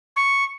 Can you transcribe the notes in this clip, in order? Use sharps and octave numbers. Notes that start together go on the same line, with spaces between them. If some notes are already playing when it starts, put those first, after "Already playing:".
C#6